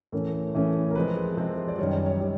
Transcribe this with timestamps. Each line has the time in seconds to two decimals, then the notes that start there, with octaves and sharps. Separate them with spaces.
0.12 A2 E3 A3 C#4 A#4
0.54 A2 E3 A3 C#4
0.91 A#4
0.95 C3 F3 G#3 C4 B4
1.37 C3 F3 G#3 C4
1.68 D5
1.78 F#2 D#3 G3 C#5
1.92 D5
2.06 C#5
2.20 D#3 G3 C#5